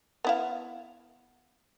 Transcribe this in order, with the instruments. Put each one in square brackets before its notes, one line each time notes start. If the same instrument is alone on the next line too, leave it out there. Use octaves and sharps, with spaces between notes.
[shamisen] B3 E4 F5